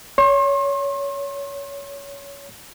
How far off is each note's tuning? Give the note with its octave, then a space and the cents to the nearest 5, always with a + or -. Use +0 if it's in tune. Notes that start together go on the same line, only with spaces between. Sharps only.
C#5 +20 C6 +40